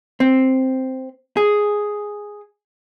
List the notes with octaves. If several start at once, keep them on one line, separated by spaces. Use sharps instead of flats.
C4
G#4